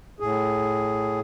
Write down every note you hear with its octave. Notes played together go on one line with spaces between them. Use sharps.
A2 G#4